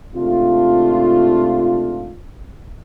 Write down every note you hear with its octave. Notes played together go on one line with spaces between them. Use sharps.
G#2 C3 A3 D4 F4